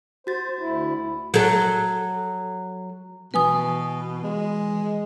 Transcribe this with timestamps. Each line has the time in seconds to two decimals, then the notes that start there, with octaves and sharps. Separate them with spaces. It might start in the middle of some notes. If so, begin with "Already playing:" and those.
0.27 F#4 C5 A6
0.59 D2 E4
1.34 F#3 A4
3.34 B2 E3 B4 G#5 D#6
4.23 G#3